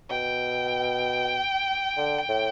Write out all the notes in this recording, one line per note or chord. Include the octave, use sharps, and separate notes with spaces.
B2 G5
D3
A2